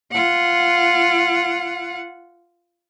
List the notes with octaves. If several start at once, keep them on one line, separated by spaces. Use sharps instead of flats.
F4 F#5